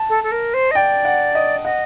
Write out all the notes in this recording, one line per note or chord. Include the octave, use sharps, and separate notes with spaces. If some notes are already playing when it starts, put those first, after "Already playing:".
Already playing: A5
A4
A4
A#4
C5
D#5
D5 G5
F#5
D#5
D#5 F#5